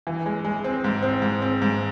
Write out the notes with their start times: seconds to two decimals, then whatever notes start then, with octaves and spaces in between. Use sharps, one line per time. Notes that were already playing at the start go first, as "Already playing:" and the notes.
0.07 E3
0.26 G#3
0.44 G#3
0.64 C4
0.84 G#2
1.03 C4
1.22 G#2
1.42 C4
1.62 G#2